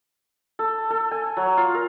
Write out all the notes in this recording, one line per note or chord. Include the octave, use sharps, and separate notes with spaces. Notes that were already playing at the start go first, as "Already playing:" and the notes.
A4
A4
G#5
F#3
F4
A#4